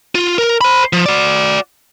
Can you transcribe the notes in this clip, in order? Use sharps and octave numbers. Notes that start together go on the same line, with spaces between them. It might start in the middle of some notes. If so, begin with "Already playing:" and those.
F4
A#4
C5 B5
F3
F#4 D5